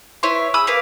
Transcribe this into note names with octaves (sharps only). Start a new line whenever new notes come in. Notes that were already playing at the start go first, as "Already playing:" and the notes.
E4 B4 C#5 C6
G#4 B5 D#6 E6
A#3 B4 F5